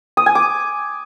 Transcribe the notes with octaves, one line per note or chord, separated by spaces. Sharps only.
D#6
G#5
D6